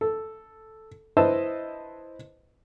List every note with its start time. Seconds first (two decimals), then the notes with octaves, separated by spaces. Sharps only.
0.01 A4
1.17 E4 B4 C5 D#5 A5 E6